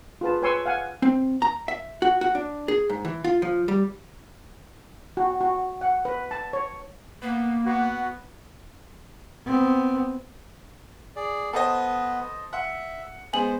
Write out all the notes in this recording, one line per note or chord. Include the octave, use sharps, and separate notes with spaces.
F4 G#4 B4 A5
B4 C#5 G#5 C6 C#6 E6
F5 F#5 G#5
C4
A#5
E5
F#4
F#4
D4
G#4
G#2
E3
F4
F3
G3
F#4
F#4
F#5
B4
A5
C#5
A#3 B3
B3 F#4
B3 C4
G#4 D5
B3 A4 B4 C5 D#5
E5 F#5
G#3 B3 C5 G#5 F#7